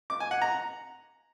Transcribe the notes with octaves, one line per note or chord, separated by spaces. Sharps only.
D6
G#5
F#5
A#5